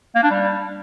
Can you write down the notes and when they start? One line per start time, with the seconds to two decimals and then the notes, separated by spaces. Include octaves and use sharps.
0.16 A#3
0.23 D4
0.31 G3